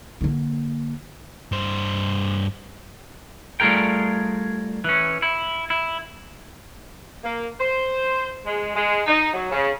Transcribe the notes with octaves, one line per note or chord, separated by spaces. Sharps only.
D3 A#3
G2 C5
G3 A3 F4 G#4 A#4 G5
E3 C#4
E4
E4
A#3
C5
G#3
G#3
D#4
F#3
C#3